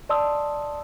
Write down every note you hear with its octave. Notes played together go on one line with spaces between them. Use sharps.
D5 D#5 A5 C6 D#6 E6